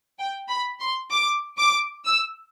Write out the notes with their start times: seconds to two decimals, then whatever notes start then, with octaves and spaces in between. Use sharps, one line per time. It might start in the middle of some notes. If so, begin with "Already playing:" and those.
0.19 G5
0.49 B5
0.80 C6
1.11 D6
1.58 D6
2.05 E6